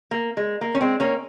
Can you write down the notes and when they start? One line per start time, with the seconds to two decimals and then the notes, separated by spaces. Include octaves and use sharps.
0.11 A#3
0.37 G#3
0.61 A#3
0.75 C#4
0.81 G#3 C4
1.00 A#3 C#4